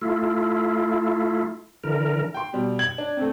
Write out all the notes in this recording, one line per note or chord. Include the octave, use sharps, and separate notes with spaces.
A3 E4 F4
D3 E3 A#4
G5 C6
B2 G3
G#6 F#7
D4
A3 C4